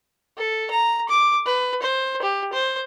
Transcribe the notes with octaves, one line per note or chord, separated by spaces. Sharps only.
A4
A#5
D6
B4
C5
G4
C5